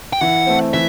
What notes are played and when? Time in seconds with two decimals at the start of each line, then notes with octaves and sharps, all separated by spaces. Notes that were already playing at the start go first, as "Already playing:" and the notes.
0.13 G5
0.21 E3 F#5
0.47 A3 C4
0.74 E3 E5